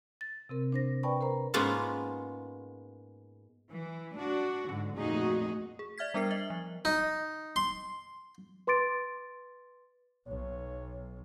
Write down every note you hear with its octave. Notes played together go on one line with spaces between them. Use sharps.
A6
C3 C4 A#4
D4 C5 A#6
B4 D5 G5 A5 B5 C#6
A#4 C5 A#5
G#2 G#3 A#3 B3 C#4 F4
E3
D4 F#4
G#2 D3
F2 A#2 A3 D#4 F#4 G#4
G#4
D5 E5 F6 G#6 B6
G3 B3 D4 A#4 C7
D#5 E5
F3
D#4
C6
B4 C6 D6 A6 D7
B1 C#5